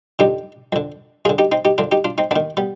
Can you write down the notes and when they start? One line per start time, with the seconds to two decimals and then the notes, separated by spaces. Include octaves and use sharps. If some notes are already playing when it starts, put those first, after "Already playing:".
0.19 F2 D3 D#4 G4
0.72 F2 D3
1.25 F2 F4 G#4
1.29 D3
1.38 D#4 G4
1.52 C4 D#4
1.65 D#4 G4
1.78 F2 D3 D4 F4
1.92 D#4 G4
2.04 D4 F4
2.18 C4 D#4
2.31 D#2 B3 D4
2.36 D#3
2.57 G3 B3